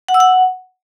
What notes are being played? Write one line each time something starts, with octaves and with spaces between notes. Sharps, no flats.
F#5
E6
F#5